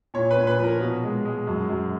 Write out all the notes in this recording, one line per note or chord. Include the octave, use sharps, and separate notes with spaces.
A#2 C#5
B4
A#2
B4
F3
A#4
B2
G#3
G#3
F#2
F#2